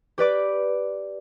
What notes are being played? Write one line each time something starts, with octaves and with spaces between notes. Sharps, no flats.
G4 B4 D5 D6